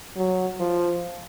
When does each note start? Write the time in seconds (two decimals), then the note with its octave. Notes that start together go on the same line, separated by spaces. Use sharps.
0.16 F#3
0.60 F3